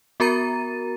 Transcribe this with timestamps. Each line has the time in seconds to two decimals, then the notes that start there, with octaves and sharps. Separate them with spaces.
0.20 B3 F#4 A#4 A#5 A6 D#7